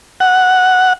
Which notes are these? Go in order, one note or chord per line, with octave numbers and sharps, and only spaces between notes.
F#5